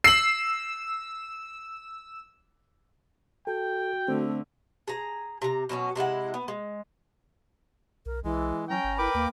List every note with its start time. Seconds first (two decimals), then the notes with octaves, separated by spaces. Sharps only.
0.04 E6 C7 F#7
3.47 F#4 A4 G5
4.08 D3 A3 C4
4.88 G#4 A#5
5.42 C3 A#5
5.69 B2 F#3 C4 C#4
5.96 C3 G#3 E4 F#5
6.34 B3
6.48 G#3
8.06 B1 A#4
8.24 B1 E3 G#3
8.70 F#3 C#4 G5 A#5
8.84 G1
8.98 E4 A#4 B4 G5 D6
9.14 D#2 A#3